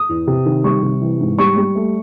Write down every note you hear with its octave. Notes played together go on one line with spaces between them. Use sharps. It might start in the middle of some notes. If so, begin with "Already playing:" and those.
Already playing: D#6
E2
C3
D#3
G3 C#6
C3
E3
G#2
G3 C#6
G3
A3